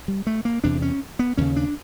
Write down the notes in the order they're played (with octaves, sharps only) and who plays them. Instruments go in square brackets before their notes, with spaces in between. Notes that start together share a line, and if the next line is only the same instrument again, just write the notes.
[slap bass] G3
A3
A#3
E2 C3 D4
C#4
B3
D#2 C#3 C#4
D4